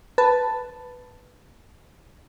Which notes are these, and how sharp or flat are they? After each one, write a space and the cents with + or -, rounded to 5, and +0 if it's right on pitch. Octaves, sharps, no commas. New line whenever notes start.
B4 +0 A5 +0